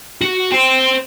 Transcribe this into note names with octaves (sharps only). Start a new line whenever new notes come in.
F#4
C5 G5